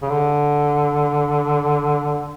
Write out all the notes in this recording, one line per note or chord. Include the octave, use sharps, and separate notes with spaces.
C#3
D3